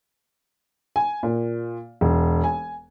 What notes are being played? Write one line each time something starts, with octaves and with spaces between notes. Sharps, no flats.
G#5
A#2
E1
G#5